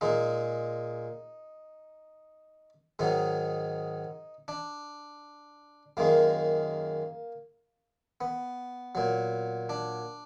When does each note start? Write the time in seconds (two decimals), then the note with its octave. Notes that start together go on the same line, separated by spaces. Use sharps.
0.01 A#2 G#3 D#4
2.99 G#2 D#3 F#3 D#4
4.48 D4
5.97 F#2 D#3 G#3 A#3
8.21 B3
8.95 A#2 F#3
9.69 D4